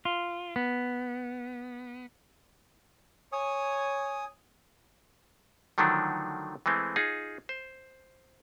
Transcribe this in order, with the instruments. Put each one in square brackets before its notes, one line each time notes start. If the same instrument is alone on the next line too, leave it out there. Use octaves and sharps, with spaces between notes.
[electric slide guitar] F4
B3
[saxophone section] C#5 [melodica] G#5 D#6
[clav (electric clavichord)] D3 D#3 F3 F#3 A3 D4
E3 G#3 A3 C4
D#4 F4 G#4
C5